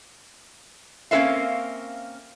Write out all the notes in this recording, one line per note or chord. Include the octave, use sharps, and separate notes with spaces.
A#3 C4 C#4 B4 E5 F5